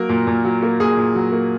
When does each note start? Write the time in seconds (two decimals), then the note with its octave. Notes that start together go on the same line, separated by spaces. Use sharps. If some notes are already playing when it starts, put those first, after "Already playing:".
Already playing: F#3 A#3 A#4
0.09 A#2
0.27 A#2
0.45 F#3
0.63 A#3
0.80 A#2 G#4
0.97 A#2
1.15 F#3
1.32 A#3